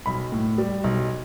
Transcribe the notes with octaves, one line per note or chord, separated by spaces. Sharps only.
B1 B5
A2
G3
B1